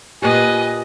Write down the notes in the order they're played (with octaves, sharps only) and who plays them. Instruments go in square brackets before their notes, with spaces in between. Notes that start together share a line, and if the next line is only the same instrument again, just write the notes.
[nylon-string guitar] A#2 G4 [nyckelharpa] B4 D#5 [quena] G#5